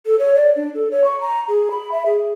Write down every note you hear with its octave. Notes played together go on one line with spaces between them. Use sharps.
A4
C#5
D5
D4
A4
C#5
C#6
A#5
G#4
B5
E5
G#4